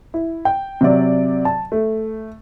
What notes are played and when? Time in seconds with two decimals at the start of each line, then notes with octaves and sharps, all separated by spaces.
0.14 E4
0.45 G5
0.81 C3 F#3 D5
1.45 A5
1.72 A3